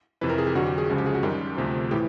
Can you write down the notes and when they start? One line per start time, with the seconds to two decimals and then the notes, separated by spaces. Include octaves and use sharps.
0.21 F2 C3 E3 B4
0.30 A#4
0.38 G#4
0.47 G4
0.55 F2 D3 F#3 F#4
0.67 G4
0.78 G#4
0.89 C#2 C#3 F3
0.98 G4
1.06 G#4
1.15 F#4
1.23 F#2 D#3 G3 G4
1.57 D2 C3 F3
1.91 A2 E3 G4